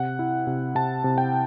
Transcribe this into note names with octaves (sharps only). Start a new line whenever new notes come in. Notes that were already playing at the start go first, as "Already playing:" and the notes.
Already playing: C3 F#5
E4
C3
C3 A5
C3
G5